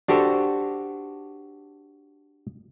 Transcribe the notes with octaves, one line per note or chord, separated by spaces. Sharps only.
D4 F#4 G4 A4 C5